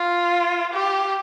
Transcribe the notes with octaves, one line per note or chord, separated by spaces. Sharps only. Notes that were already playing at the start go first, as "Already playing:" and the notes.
Already playing: F4
G4